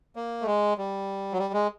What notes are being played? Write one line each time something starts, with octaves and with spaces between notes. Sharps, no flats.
A#3
A3
G#3
G3
F#3
G3
G#3